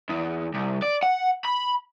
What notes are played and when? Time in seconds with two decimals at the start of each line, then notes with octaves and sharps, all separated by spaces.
0.09 E2
0.54 C2
0.83 D5
1.03 F#5
1.44 B5